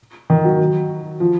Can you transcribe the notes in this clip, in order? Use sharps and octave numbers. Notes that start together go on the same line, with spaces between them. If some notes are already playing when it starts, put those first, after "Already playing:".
D#3
F#3
F3